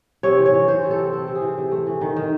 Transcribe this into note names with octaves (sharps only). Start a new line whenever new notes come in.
C3 C#5
E3
C#5
E3
E3 C5
C3
A4
C4
C4 A4
C3
G#4
E3
C3
A3
E3
D#3
D#3